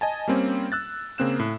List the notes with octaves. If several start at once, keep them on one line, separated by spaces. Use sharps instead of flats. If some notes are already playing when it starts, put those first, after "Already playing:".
D#5 G#5 A5
G3 A#3 C4 C#4
E6 F#6 A6
C#3 A#3 C4 F#6 E7
A2